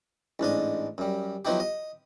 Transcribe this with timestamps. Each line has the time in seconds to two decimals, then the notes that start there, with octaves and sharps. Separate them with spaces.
0.40 A1 G#2 D4 D#5
0.98 F#2 G3
1.45 F3 F#3 B3 D#4 E4 G4
1.60 D#5